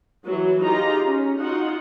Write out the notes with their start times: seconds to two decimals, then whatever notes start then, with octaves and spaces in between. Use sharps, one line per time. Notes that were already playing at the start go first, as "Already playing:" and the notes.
0.24 E3 F#3 F#4
0.63 D#4 F4 G4 G#4 A#5
1.06 C#4
1.39 D#4 F4 F#4 F#5